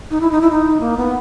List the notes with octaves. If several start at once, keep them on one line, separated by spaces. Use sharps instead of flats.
D#4
E4
D#4
E4
D#4
A#3
B3